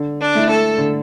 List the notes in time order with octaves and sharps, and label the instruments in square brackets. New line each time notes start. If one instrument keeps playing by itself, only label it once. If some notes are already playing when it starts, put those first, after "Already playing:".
Already playing: [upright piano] D3
[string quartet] D4
[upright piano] A3 E4
[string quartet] A4
[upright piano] D3